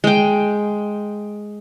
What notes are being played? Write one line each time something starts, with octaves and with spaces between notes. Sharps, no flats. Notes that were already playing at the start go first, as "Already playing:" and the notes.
G#3 G5